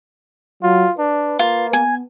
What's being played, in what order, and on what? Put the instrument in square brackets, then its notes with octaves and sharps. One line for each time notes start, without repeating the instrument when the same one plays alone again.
[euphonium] F#3 [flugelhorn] F4
[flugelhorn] D4 [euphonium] B4
[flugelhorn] A#3 [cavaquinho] F4
[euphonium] B3 [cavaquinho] G#5